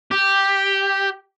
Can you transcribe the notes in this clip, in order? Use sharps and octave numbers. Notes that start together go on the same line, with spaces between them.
G4